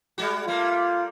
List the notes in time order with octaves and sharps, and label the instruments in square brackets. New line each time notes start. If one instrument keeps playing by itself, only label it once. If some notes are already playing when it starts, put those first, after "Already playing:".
[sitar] G3 G#3 F#4
[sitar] G3 A3 A#3 [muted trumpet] F4